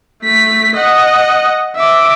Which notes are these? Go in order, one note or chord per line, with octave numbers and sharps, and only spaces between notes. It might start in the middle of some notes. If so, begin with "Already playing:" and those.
A3 B6
D#5 F#5
E5 D6